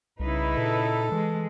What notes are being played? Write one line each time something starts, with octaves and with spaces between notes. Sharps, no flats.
C2 C#3 D#4 E4 B4
A#2 A4
E3 G#3